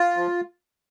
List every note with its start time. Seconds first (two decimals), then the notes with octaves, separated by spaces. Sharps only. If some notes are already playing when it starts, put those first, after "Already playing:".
Already playing: F4
0.16 F3